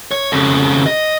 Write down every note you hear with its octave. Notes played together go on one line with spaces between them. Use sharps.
C#5
F2 C#3
D#5